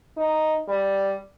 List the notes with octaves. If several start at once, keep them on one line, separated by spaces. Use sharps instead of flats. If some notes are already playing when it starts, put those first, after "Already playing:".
D#4
G3